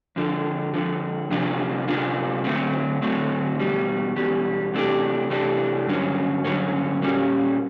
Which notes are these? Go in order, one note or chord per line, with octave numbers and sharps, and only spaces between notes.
F2 D3 F3
F2 D3 F3
C3 F3 A#3 D4 F4
C3 F3 A#3 D4 F4
D3 F#3 A3 C4
D3 F#3 A3 C4
E2 B2 G3
E2 B2 G3
C3 E3 A3 D4 G4
C3 E3 A3 D4 G4
G2 D3 F#3 A#3 C#4
G2 D3 F#3 A#3 C#4
A#2 G3 A#3 C#4